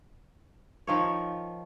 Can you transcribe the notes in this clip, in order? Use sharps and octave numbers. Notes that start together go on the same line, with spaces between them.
D#3 F3 C#5